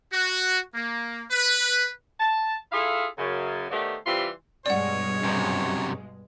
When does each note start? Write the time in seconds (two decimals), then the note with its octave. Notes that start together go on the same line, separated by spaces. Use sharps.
0.12 F#4
0.75 A#3
1.30 B4
2.20 A5
2.72 E4 F4 G#4 A4 E5 F5
3.18 F#2 C#3
3.71 D#3 A3 B3 G4 C5 D5
4.06 C3 E3 G3 F4 B5 C6
4.66 G2 B2 G#3 C#5 D5 F#5
5.23 F#2 C3